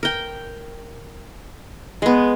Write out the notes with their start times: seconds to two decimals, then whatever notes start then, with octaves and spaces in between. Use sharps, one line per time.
0.03 A#4 G5
2.02 G#3 B3